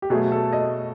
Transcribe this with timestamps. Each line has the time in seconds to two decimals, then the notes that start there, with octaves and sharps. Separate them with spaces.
0.02 G4
0.10 B2 F#3 A3 G#4
0.32 A4
0.53 D#5